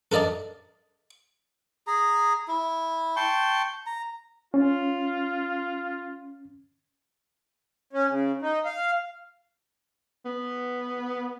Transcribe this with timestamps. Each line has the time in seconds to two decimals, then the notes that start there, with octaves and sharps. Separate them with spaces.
0.12 A4 A#4 D5 D#5 A5
1.87 G#4 A#5
2.48 E4
3.16 G5 A5 C6 C#6
3.86 A#5
4.54 C#4 F4
7.93 C#4
8.10 C#3
8.42 D#4
8.65 F5
10.26 B3